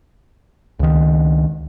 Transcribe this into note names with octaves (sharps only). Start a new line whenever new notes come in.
C#2 D#3